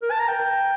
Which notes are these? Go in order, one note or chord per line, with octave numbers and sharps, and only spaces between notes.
A#4
A5
A#5
G5